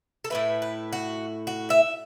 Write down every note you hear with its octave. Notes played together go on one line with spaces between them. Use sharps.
A4
A2 A3 E4 B4
B4
F#4
F#4
E5